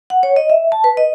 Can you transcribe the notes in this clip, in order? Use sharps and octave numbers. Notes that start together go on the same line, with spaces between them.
F#5
C#5
D#5
E5
A5
B4
D#5